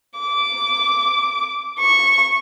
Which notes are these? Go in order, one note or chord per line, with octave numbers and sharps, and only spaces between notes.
D6
C#6